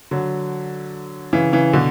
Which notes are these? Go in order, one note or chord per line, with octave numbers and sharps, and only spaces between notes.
D3 F#3
C#3 E3
C#3 E3
B2 D3